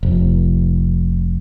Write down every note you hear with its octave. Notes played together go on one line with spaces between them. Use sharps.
F1